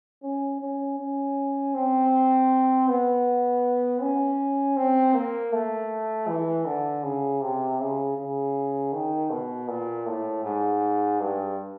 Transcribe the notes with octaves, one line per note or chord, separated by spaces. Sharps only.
C#4
C#4
C#4
C4
B3
C#4
C4
A#3
A3
E3
D3
C#3
C3
C#3
C#3
D#3
B2
A#2
A2
G#2
G2